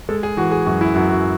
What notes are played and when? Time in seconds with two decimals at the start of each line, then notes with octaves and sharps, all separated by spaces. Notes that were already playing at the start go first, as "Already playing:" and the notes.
0.09 G#3 A4
0.23 G#4
0.37 E3 F#4
0.52 G#4
0.66 F#2 F#4
0.81 E4
0.95 F#2 F#4
1.10 F#4